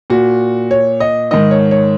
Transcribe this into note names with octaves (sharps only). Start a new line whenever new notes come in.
A#2 F#4
C#5
D#5
G#2 D#3 D#5
C#5
C#5